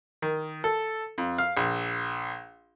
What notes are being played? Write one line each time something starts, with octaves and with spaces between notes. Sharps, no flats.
D#3
A4
F2
F5
A#1